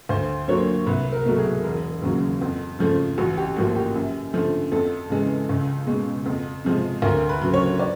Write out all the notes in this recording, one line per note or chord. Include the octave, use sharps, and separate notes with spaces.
D2 C5
D3 F#3 A#3 C#5
C2 B4
A#4
B2 F#3 A3
G#4
E1
D#2 C#3 F#3
F2
C#3 F3 A3
A1 F#4
G4
A2 F3 A#3 F#4
G4
F#2
D3 F3 A3
F2 A4
C#3 E3 G#3
C#2
B2 G#3
F2
C3 F3 G#3
D2 A#4
B4
C#3 F#3
C#5
D5